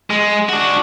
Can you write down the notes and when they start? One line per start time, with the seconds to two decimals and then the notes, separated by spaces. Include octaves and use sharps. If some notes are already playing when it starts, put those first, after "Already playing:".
0.10 G#3
0.49 D4 F#4